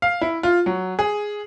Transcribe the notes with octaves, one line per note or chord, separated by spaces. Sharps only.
F5
E4
F4
F#3
G#4